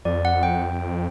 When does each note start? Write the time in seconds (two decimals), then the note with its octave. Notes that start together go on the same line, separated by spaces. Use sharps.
0.05 F2 D5
0.25 F#5
0.43 G5